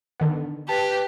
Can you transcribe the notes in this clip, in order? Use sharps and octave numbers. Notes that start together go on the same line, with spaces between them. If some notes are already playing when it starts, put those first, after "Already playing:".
D3 D#3 B3
G4 B4 A5